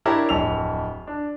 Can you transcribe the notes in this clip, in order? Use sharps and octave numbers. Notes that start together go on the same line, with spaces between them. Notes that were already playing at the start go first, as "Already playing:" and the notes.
D4 E4 G4 A#4 C#5
D1 F2 E6 F7
D4